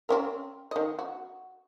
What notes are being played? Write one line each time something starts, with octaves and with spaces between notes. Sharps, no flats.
C4 C#4 A#4
D#3 D#5
F#4